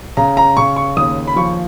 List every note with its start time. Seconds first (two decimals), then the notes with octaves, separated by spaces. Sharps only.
0.17 C#3 A#5
0.37 A#5
0.57 C#3 C#6
0.76 C#6
0.97 D#2 D#6
1.27 B5
1.36 F3 C#6